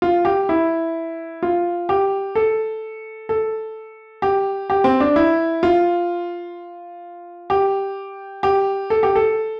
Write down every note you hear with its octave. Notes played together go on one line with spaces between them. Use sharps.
F4
G4
E4
F4
G4
A4
A4
G4
G4
C4
D4
E4
F4
G4
G4
A4
G4
A4